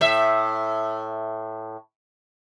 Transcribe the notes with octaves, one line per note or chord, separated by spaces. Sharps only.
A2 E5